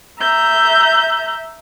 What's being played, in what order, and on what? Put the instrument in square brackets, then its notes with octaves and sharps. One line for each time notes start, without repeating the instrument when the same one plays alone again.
[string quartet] E5 A#5 G6